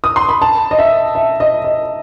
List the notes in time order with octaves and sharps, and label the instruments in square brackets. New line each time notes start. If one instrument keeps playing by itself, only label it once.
[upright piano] D#6
C6
B5
A5
D#5
E5
E5
D#5
D#5